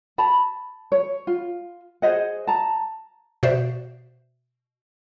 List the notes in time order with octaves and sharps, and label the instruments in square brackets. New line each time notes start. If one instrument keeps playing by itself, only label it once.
[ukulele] A5 B5
C#5
F4
G#4 C5 D#5 F#5
A5 A#5
[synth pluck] B2 F#4 C5 D5 E5